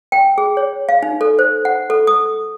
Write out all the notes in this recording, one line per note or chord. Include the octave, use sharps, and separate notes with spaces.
G5
G#4
C#5
F5
D#4
A4
C5
F#5
A4
D#6